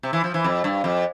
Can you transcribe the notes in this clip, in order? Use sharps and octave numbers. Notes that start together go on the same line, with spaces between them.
C3
E3
F3
E3
F2
G2
F2